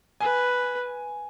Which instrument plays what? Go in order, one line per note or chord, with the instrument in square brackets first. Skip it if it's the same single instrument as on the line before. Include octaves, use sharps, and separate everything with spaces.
[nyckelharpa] B4 [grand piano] G#5